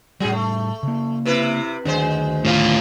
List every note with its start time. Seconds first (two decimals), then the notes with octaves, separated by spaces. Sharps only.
0.20 A2 F#3 G3 G#4
0.32 A3
0.83 C#3 A#3
1.25 C3 E4 B4
1.85 D2 D#3 F#3 G#3 D4 C5
2.45 A2 F4